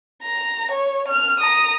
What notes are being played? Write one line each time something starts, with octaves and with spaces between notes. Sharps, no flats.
A#5
C#5
F6
A#5 D#6